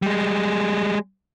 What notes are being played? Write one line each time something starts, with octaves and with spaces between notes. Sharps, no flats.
G3 G#3